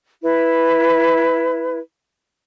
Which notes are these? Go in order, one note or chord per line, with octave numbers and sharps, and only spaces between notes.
E4 B4